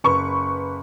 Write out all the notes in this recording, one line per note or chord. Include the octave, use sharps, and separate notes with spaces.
F#1 B4 C#6